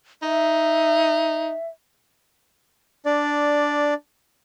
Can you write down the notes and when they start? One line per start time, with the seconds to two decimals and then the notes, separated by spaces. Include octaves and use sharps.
0.22 D#4 E5
3.06 D4 D5